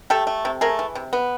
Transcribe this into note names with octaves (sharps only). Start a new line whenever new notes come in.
A3 G4 A4
A3
C3
A3 G#4 A#4
E3
C3
B3